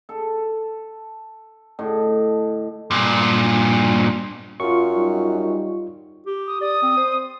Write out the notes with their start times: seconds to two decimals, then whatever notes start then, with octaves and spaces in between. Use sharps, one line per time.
0.09 A4
1.79 A2 D3 D#5
2.91 G2 A#2
4.60 F#2 F4 C#6
4.94 G3 D#4
6.26 G4
6.47 D#6
6.62 D5 D#6
6.83 C4
6.97 C5